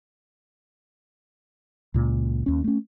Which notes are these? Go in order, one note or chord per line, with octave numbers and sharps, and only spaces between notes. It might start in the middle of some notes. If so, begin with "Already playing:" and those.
C#2 A#2
D#2 C#4
A3 C#4